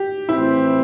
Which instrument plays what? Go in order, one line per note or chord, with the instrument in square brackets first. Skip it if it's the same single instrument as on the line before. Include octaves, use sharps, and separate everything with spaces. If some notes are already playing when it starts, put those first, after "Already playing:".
Already playing: [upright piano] G4
[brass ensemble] A2 E3 C4 [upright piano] E4